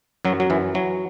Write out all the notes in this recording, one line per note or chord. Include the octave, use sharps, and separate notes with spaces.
F#2 F#3
F#3
F#2 E3
E3 F#3